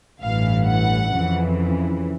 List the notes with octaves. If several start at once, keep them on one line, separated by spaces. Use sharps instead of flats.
A1 G2 E3 F5
F#5
F2 C#3 E3